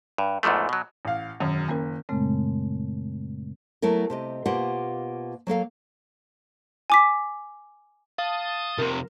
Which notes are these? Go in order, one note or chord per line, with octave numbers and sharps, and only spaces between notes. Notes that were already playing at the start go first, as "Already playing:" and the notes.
G2
E2 G#2 E3 F3 A3
B2 F#3
A1 F5
E1 F#2 D#3
F#1 A#3 C#4 A#4
F#2 A#2 C#3 G#3 A3 C4
F#3 A3 B3 E4 A#4
C3 G4 D#5
B2 A#3 F4 G4 C5 F#5
F#3 A#3 A4 F5
G#5 D6 B6
F5 A5 D#6
F2 C3 A#4